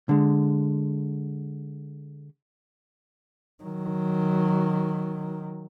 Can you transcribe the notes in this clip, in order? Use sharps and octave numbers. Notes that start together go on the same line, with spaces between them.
D3 G#3
D#3 F#3